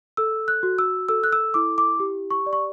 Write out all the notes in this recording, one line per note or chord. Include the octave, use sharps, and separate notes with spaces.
A4 E6
F#6
F#4
E6
A4 E6
F#6
E6
E4 D6
D6
G4
C#6
D5
C#6